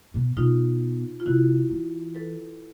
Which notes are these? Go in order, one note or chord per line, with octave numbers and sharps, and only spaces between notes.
B2
B2 D#4 F4
F4
C3 E4 F#4
E3
A4 B4